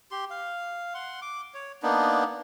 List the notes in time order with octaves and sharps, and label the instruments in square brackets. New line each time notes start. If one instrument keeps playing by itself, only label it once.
[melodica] G4 C6
F5
F#5 C6
D6
C#5
A#3 B3 D4 D#4